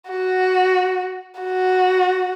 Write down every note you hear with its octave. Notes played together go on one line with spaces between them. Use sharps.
F#4
F#4